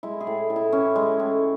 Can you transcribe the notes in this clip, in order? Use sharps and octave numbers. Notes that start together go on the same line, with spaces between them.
G#3 E4
G#4
A2
A2
E4
E3 C#4
G#3
A2